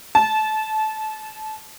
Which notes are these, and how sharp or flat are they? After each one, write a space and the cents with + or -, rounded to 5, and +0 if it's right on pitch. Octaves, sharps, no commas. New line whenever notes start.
A5 -25